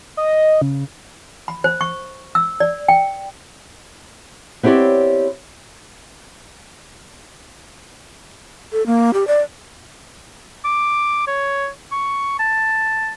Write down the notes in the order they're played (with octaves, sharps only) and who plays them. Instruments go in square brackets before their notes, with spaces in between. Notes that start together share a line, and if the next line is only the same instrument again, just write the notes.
[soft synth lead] D#5
C#3
[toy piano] B5
C5
C#6
E6
D5
G5
[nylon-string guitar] B3 C4 E4 G4 C#5 D5
[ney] A4
A#3
G4
D5
[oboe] D6
C#5
C#6
A5